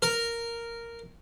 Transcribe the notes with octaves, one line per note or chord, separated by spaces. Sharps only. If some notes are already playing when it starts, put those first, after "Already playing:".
A#4